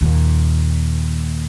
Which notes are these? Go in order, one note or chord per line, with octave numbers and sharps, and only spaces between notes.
D#2 A#2